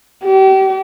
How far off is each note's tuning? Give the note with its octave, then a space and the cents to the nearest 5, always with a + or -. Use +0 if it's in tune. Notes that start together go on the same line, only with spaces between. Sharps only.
G4 -35